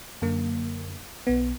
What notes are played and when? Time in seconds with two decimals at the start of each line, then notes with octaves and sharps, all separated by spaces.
0.22 F#2 D3 A#3
1.27 B1 B3